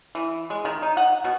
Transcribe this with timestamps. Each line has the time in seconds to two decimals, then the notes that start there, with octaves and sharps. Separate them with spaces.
0.15 E3
0.50 G#3
0.65 D#3
0.82 D#4
0.97 F#5
1.24 B2